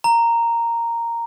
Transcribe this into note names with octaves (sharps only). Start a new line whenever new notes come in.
A#5